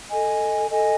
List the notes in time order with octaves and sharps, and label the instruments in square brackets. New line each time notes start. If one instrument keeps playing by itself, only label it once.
[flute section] A4 D#5 G#5
A4 D#5 G#5